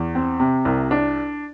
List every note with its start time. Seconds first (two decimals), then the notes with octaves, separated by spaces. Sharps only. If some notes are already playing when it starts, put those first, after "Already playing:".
Already playing: E2
0.15 C4
0.40 C3
0.65 C2
0.91 D4